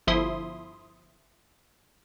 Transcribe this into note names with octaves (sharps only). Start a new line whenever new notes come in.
G1 F3 E4 E5 C6 D#6